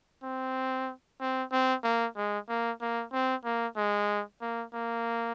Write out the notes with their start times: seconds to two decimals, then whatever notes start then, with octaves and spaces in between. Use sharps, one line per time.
0.24 C4
1.21 C4
1.52 C4
1.84 A#3
2.16 G#3
2.49 A#3
2.81 A#3
3.13 C4
3.45 A#3
3.77 G#3
4.41 A#3
4.74 A#3